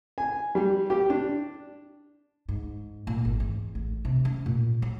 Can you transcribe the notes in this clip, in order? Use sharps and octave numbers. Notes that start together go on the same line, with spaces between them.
G#5
G3
G4
D4
G#2
A#2
G#1
E2
A1
C3
C#4
A#2
F#3